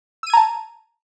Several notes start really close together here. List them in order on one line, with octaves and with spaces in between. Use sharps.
E6 D#7 G#6 A#5 A5